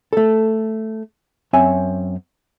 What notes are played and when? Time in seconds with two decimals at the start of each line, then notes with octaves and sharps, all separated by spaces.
0.13 A3 A4
1.53 F#2 C4 C#5 E5 G#5